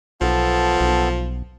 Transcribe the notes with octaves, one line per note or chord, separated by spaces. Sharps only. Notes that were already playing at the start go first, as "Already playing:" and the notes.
B1 F3 B3 A4 A5
B1